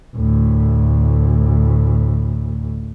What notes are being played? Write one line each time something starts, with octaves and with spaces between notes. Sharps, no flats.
D2 A2